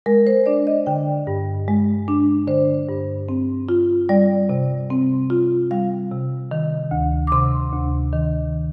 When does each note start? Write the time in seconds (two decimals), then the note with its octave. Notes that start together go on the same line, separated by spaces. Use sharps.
0.06 G#3 A#4
0.27 C5
0.46 D4 D5
0.67 D#5
0.86 D3 G5
1.27 G2
1.68 G#3
2.08 D4
2.48 D3 C5
2.89 G2
3.29 C4
3.69 F4
4.09 G3 D5
4.49 C3
4.90 C4
5.30 F4
5.71 G3 F5
6.11 C3
6.51 D#3
6.91 D2
7.27 D6
7.32 C3 C6
7.73 D2
8.13 D#3